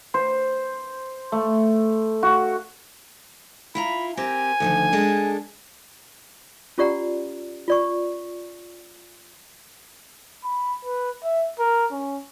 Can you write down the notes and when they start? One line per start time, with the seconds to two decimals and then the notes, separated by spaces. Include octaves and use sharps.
0.14 C5
1.32 A3
2.23 F#4
3.75 E4 F4 A#5 B5
4.17 C4 G4 A#4 G#5
4.60 D2 D#3 F3
4.92 G#3 D4 A4
6.78 C#4 F4 G4 D5 F#5 A#5
7.68 F4 D5 C#6
10.44 B5
10.85 B4
11.24 E5
11.59 A#4
11.92 C#4